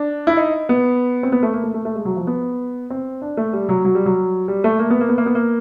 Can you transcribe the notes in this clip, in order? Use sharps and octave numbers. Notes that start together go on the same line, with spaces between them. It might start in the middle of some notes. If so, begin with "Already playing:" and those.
Already playing: D4
E4
D#4
B3
C4
B3
A3
A#3
A3
A3
A3
G#3
F#3
F3
B3
C4
D4
A3
G3
F#3
F#3
G3
F#3
G3
A3
A#3
B3
A#3
B3
A#3
B3
A#3